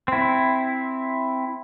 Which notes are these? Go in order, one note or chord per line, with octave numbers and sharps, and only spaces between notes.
C4 E4